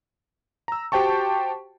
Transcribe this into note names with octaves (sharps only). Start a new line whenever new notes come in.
A#5 E6
F#4 G4 C5 G5 A5 C#6